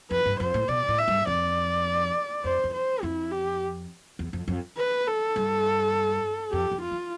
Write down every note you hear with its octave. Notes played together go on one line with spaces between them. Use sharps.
F2 B4
G2
F2 C5
A2
B2 D5
A2
E5
G2
F2 D5
F2 C5
F2
C5
F2 E4
G4
E2
F2
F2
B4
A4
G2
F2 G4
F2
F4
E3